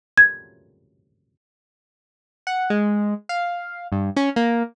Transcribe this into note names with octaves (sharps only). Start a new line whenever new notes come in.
G#6
F#5
G#3
F5
G2
C#4
A#3